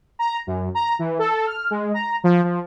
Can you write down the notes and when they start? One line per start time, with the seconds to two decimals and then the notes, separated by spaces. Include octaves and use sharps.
0.19 A#5
0.47 F#2
0.75 A#5
0.99 E3
1.19 A4
1.47 F6
1.71 G#3
1.94 A#5
2.24 F3
2.44 F3